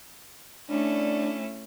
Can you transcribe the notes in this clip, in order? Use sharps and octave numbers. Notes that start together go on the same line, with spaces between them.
A3 C#4 D4 E4